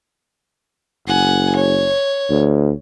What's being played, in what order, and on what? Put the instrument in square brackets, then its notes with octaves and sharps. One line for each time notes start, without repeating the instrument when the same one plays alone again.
[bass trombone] F#1 [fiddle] F#5 G#5
[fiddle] C#5
[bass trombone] D2